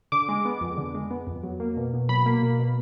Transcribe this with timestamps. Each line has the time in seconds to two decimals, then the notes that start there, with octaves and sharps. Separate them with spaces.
0.12 D3 D6
0.29 G#3
0.45 B3
0.61 F2
0.78 D3
0.95 G#3
1.11 B3
1.27 F2
1.43 F#3
1.60 A#3
1.77 B2
1.93 B2
2.09 F#3 B5
2.26 A#3
2.43 B2
2.59 B2